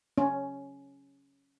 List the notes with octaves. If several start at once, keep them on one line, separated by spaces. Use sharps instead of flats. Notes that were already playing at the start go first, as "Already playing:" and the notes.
C#4